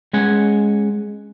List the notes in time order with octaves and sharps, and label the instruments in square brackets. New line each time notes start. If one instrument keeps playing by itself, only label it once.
[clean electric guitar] G#3 C#4 F#5 G#5